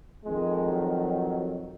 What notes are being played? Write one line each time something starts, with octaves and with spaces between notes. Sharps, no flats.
F2 D#3 G#3
F#3